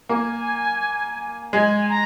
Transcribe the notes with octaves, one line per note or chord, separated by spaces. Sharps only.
A#3 G#5
G#3 G#5
A#5